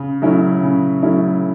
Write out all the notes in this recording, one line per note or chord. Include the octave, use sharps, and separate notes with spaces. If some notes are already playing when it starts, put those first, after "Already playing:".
Already playing: C#3
F#3 A3 C#4 E4
C#3
F#3 A3 C#4 E4